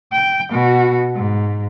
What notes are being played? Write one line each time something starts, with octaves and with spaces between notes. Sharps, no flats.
G5
B2 F#4
G#2